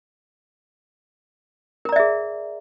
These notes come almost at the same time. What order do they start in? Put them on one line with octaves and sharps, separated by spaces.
A#4 A#5 D5 E5 G#4